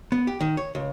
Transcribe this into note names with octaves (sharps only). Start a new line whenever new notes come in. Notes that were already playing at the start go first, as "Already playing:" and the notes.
B3
G4
D#3
C#5
C#2